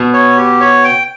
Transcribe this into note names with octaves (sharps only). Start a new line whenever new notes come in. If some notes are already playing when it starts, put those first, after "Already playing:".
Already playing: B2 B3
C#5
G4
C#5
G5